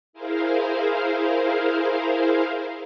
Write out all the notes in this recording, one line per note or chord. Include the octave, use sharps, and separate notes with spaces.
E4 G#4 A#4 C5 F5